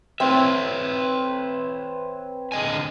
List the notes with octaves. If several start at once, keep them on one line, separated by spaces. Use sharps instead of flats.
C4 B4 C#5 E5
D3 D#5 G#5